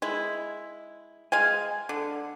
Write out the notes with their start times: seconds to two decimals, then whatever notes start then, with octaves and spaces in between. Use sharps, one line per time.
0.02 G#3 E4
1.32 G#3 F5 G#5
1.89 D3